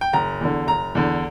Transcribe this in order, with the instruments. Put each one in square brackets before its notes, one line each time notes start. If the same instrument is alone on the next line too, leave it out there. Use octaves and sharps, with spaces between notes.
[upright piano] G5
F#1 A#5
E2 D3
F#1 A#5
E2 D3